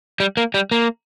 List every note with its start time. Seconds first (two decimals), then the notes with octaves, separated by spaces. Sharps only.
0.20 G3
0.37 A#3
0.54 G3
0.71 A#3